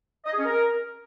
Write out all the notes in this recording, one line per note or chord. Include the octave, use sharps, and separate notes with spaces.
D#5
G#4
C#4
A#4